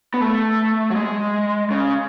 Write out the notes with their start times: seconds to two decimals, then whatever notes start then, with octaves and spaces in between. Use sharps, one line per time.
0.14 B3
0.21 A3
0.90 F#3
0.96 G#3
1.71 C#3